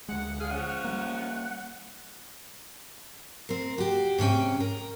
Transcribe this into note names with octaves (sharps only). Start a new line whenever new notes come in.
D2 G#3 F#5
D4 G#4 F5
F3 C#4 F#5
G3 A#3
C4 A#4
F#4 G4
G#2 C3 C#4 G5
A#4